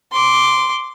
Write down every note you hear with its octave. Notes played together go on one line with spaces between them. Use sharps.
C6 D6